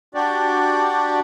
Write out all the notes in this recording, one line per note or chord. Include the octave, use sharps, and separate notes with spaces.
D4 F#4 G4 D5